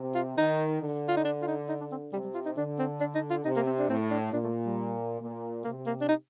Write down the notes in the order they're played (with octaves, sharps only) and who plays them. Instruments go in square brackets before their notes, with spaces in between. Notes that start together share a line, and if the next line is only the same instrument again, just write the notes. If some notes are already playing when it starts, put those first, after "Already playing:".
Already playing: [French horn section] C3
[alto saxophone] F4
[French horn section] D#3 [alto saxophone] D#4
[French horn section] D3
[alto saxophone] F4
D#4
D4
F4
D#4
D#4
D4
C4
[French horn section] C3 [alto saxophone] G3
[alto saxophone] G3
F4
D#4
[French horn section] D3 [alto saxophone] D4
[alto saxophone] C4
D4
D#4
F4
[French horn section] C3 [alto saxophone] D#4
[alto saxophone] A#3
C4
D4
[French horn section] A2 [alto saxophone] C4
[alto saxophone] D4
[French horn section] A#2 [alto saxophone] D4
[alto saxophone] A3
G3
[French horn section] A#2
[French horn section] C3 [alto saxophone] A#3
[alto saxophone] A#3
D4
D#4